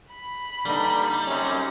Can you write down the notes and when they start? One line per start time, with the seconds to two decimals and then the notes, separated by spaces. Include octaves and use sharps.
0.12 B5
0.65 G2 D3 G3 A#3 D#4
1.28 F#2 C3 C#4